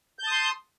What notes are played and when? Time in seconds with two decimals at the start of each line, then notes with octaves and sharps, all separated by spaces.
0.19 G6
0.23 A5
0.28 D#6
0.32 C6